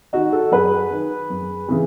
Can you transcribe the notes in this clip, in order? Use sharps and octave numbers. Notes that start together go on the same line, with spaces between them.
D#3 D#4 F#4
F#4 A4
F#2 G#4 B4
D#3
F#2
C#3 E3